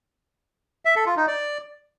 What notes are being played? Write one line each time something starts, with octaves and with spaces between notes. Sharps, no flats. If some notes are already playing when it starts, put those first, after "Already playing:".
E5
A4
F4
D#4
D5